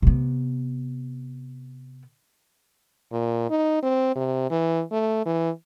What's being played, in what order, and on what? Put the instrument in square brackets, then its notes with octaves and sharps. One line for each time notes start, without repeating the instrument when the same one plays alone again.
[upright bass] C3 B3
[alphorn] A#2
D#4
C4
C3
E3
A3
E3